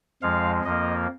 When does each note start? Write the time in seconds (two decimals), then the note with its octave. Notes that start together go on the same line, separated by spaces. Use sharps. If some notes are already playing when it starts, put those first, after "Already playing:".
0.22 F2 F3 G#3 F5
0.64 F2 F3 A#3 D#5